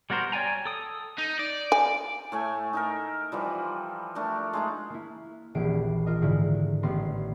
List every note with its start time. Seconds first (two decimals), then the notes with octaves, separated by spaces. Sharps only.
0.10 G3 B3 F#4 A#4 C5
0.32 C#5 D5 G5 G#5 A#5
0.65 A4 D#6
1.18 D#4
1.39 D5
1.72 G#5
2.32 A2 A3 G#5
2.73 D#4 A4 A#4
3.32 E3 F3 G3
4.15 A3 D4 A#4
4.53 G#3 A3 D#4
4.90 A#3 E4
5.55 D#1 A#1 E3 C7 D7
6.06 F4 A#4 D#5
6.22 G#2 D3 D#3 G#3 E4
6.83 A1 B3 C6 A#6